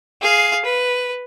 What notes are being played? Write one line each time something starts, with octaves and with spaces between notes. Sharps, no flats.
G#4 F5
B4